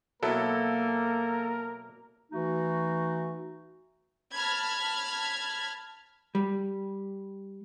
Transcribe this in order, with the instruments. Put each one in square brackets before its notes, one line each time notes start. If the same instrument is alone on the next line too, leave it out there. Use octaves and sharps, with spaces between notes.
[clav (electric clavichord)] B2 F#3 E4 [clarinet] A#3 [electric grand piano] A4 [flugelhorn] A#4
[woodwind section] E3 A3 D#4 F#4
[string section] A5 B5 F6 G#6
[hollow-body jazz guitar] G3